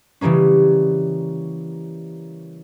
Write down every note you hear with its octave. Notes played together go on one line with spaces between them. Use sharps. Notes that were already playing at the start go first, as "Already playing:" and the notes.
C#3 E3 G3 A#3 C#4